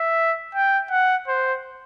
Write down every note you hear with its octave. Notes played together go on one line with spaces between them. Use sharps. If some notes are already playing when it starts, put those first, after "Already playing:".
Already playing: E5
G5
F#5
C5